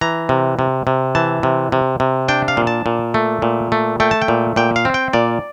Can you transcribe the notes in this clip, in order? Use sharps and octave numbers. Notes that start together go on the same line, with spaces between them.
E3 A#5
C3
C3
C3
E3 A5
C3
C3
C3
D4 G5
F5
A#2
A5
A#2
A3
A#2
A3
A3 G5
A5
G5
A#2
A#2 G5
F5
C4
G5
A#2 D5